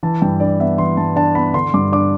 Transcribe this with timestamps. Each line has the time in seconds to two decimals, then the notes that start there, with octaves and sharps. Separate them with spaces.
0.03 E3 A5
0.22 G2 G5
0.40 D4 D5
0.60 B3 E5
0.78 E3 C6
0.97 G2 A5
1.16 D4 A5
1.35 B3 B5
1.54 D3 C6
1.74 G2 D6
1.92 D4 D6